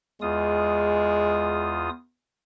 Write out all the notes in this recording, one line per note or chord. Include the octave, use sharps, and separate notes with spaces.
E2 G#3 F4 D#6